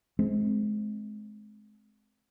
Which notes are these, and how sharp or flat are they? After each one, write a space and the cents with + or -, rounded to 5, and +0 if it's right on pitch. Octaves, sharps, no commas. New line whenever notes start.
G#3 +30 C4 +0